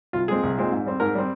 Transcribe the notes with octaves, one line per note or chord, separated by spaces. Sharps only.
C2 F4
A#2 G#3 C4 G#4
C2
A#2 G#3 C4
G#2
G3 C4
G#2 A#4
G3 C4